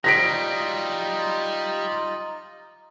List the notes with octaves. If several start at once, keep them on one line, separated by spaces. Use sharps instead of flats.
F#3 G3 D#4 F4 D#5 A#6 B6 D7